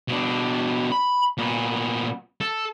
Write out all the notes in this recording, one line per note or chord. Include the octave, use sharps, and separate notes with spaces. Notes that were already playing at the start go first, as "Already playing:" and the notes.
B2 D4
B5
A#2 B3
A4